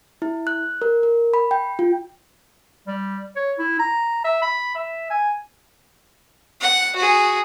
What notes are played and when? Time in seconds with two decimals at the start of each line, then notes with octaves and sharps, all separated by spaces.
0.22 E4
0.47 F#6
0.82 A#4
1.03 A#4
1.34 B5
1.51 G5
1.79 F4
2.87 G3
3.36 C#5
3.59 E4
3.79 A#5
4.25 E5
4.42 B5
4.75 E5
5.10 G#5
6.61 F#5
6.96 F#4 G#4